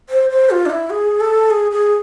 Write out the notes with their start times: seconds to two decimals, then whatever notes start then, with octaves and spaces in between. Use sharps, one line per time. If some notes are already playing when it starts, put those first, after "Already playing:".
0.09 C5
0.30 C5
0.50 F4
0.66 D4
0.70 E4
0.90 G#4
1.20 A4
1.50 G#4
1.71 G#4